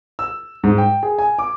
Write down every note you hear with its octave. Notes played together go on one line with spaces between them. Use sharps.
E6
G#2
G5
G#4
G#5
D6